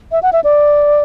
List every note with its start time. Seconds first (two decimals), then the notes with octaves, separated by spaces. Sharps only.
0.12 E5
0.23 F#5
0.33 E5
0.44 D5